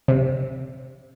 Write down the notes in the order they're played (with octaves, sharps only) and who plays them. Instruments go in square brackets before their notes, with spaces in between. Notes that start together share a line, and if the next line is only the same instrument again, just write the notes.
[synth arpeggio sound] C3